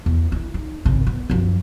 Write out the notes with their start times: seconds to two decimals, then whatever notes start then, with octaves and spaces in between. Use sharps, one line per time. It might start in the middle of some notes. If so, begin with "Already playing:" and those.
0.06 E2
0.32 E4
0.54 D#4
0.85 G#1 C#3
1.07 B3
1.30 F#2 F3